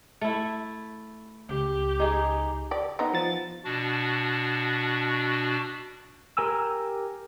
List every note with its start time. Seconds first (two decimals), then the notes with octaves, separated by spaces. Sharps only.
0.21 A3 E4
1.49 C#2 G4
2.00 D#4 G#4
2.71 G4 D5
2.99 B3 D#4
3.14 F3 A6
3.65 B2 D4 F#4
6.37 G4 A#4 G#5 E6